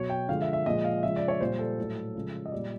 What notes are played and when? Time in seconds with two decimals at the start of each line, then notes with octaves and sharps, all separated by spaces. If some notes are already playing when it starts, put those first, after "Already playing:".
Already playing: B2 F#3 C#5
0.10 G5
0.28 D3 F3 G#3 F5
0.42 E5
0.53 E5
0.66 A#2 F3 G#3 D#5
0.84 F5
1.03 C#3 F3 G#3 E5
1.16 D5
1.28 C#5
1.40 A#2 G3 C5
1.59 A4
1.79 A2 F#3
2.15 C#3 F3 G#3
2.46 D#5
2.52 A#2 G3 D5